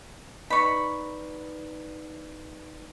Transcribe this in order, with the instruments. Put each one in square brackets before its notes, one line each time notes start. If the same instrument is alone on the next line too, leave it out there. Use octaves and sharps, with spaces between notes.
[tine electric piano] D#4 B4 D5 [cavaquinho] B5 C#6